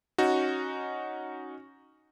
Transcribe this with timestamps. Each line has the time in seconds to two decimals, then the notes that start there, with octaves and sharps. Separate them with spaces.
0.18 C#4 D#4 F#4